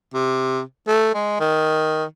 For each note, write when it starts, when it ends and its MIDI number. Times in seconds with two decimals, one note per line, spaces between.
0.14 0.62 48
0.88 1.12 57
1.14 1.36 56
1.40 2.04 51